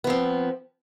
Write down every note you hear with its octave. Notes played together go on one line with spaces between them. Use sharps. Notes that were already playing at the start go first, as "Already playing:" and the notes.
F3 B3 C4